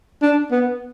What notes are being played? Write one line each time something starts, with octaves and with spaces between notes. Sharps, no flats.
D4
B3